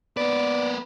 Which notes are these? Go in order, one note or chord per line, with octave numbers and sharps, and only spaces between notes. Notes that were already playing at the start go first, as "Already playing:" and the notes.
A#3 B3 B4 D5